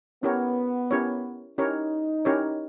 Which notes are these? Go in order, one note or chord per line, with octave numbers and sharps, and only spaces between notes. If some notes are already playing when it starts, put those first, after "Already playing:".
B3 C#4 E4 G4 A#4 C#5
C#4 E4 G4 A#4 C#5
C#4 D#4 E4 G4 A#4 C#5
C#4 E4 G4 A#4 C#5